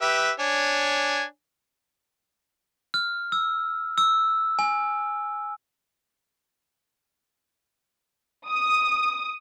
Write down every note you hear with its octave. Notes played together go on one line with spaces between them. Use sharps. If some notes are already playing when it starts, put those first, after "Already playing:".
G4 B4 E5
D4 C#5 G#5
F6
E6
E6
G#5
D#6